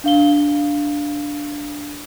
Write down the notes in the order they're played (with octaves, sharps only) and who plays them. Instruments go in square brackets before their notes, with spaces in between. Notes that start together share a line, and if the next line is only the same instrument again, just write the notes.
[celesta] D4 F5 G7